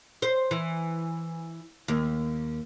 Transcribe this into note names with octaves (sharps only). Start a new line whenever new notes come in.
C5
E3
D#2